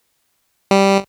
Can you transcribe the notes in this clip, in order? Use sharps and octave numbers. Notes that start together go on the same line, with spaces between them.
G3